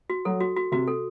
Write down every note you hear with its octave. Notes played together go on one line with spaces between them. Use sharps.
F#4
F#3 A4
F#4
F#4
C3 F#4
A4